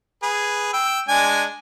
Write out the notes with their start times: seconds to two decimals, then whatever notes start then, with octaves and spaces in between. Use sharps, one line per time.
0.23 G#4 B4
0.73 G5 E6
1.08 G#3 D4 G#5